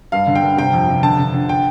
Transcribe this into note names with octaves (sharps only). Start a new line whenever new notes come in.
G2 F5
D3
G5
G2
C3 G5
F2
C3
D3 A5
D3
D3
G5